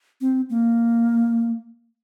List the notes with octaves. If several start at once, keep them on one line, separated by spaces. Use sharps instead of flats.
C4
A#3